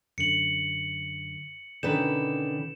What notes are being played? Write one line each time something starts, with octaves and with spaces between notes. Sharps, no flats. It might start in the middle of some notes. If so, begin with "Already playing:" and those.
F#2 D3 C#7 F#7
B2 D3 D#3 C#4 B4 G6 E7